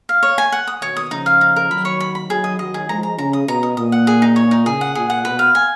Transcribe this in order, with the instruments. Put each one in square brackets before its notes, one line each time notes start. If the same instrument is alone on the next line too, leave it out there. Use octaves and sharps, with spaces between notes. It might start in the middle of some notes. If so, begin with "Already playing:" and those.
[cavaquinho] F5
C#5
G#5
F#5
D#6
[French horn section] B2 D#3 [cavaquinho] C#5
[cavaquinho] D#6
[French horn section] C#3 F3 [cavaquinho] D#4
[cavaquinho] F5
D#4
A#4
[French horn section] D#3 F#3 [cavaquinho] B5
[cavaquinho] C#5
B5
B5
[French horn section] D#3 F#3 [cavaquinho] G#4
[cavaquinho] D#5
[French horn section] D#3 F#3 [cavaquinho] D#5
[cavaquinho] G#4
[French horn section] F3 G#3 [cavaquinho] A#5
[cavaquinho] A#5
[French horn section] C#3 [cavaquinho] A#5
[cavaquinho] D#6
[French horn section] B2 [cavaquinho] A#5
[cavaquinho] D#6
[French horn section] A#2 [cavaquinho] D#6
[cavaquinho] F#5
G#4
D#4
C#5
D#4
[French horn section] C#3 [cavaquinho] G#4
[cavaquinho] F#5
[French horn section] A#2 [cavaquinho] G#4
[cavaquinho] F#5
[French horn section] B2 [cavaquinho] B4
[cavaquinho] F5
G#5